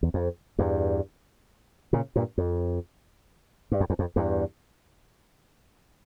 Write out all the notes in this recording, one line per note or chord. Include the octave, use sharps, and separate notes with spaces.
E2
F2
E2 G2
A#2 C#3
G2 A#2
F2
G2
F2
E2
F2
E2 G2